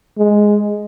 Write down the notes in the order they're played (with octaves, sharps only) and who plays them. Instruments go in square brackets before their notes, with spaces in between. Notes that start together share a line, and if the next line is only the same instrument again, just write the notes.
[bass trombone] G#3